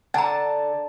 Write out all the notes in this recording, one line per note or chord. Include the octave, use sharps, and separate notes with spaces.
D3 F#5 A5 A#5